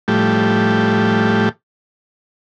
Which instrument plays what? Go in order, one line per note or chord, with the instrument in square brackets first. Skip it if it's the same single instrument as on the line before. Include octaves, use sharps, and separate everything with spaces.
[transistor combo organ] A2 F3 G3 A3 G4